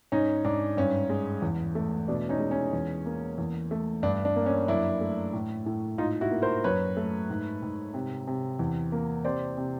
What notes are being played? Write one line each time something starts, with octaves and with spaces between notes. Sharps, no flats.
G#2 C#4 D#4
G#2 D4
G2 C#4
G#3
E2
A3
B2 D4
C#4 D#4
G#3
C#4
E2
A#3
E2
A3
G2 D4
D4
A#3
C#4
F#2 D4 E4
A3
A2
A2
G#2 D#4 F4
E4 F#4
A#3
A#4 C5
F#2 B4 C#5
A3
G#2
G#2
C3
C3
E2
A#3
C3 C5 D5
C3